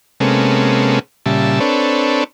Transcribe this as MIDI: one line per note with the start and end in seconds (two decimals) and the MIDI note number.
0.20 0.99 48
0.20 0.99 56
0.20 0.99 58
0.20 0.99 59
0.20 0.99 61
0.20 0.99 69
1.26 1.60 46
1.26 1.60 49
1.26 1.60 55
1.26 1.60 76
1.26 1.60 81
1.60 2.24 60
1.60 2.24 62
1.60 2.24 69
1.60 2.24 71
1.60 2.24 73